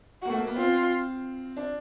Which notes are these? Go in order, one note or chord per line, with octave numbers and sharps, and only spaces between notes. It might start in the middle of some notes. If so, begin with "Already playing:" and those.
A#3 F#4
A3
A#3
B3
C4 F4
D4